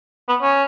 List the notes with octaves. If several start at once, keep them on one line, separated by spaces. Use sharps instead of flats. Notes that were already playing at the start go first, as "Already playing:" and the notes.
B3
C#4